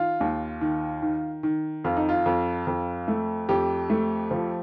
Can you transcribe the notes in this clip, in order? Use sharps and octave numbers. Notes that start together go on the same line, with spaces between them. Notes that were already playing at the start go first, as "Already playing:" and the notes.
Already playing: D#3 F4
D#2
D#3
D#3
D#3
F2 F4
D#4
F4
F2
F2
A3
F2 G4
A3
F3